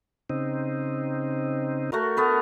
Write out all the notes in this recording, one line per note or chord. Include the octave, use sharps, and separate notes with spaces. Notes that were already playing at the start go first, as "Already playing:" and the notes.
C#3 C4 D#4
A3 F#4 A#4
A3 B3 A#4